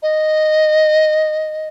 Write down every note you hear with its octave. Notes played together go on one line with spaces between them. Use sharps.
D#5